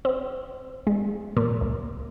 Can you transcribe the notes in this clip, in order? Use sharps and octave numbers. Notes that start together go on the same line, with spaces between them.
C4
G#3
A#2
C#2